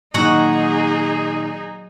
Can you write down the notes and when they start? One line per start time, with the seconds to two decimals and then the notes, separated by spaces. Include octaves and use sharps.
0.14 A#2 D#3 F#3 D#4 F#4 G#4 F#5